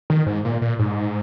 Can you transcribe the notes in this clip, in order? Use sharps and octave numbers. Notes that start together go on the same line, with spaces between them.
D#3
G#2
A#2
A#2
G#2